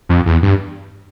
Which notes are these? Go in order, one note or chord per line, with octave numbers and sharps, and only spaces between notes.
F2
E2
G2